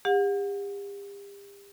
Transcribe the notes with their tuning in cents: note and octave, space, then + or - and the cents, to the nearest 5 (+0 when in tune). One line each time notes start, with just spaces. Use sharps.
G4 +40 F#5 -35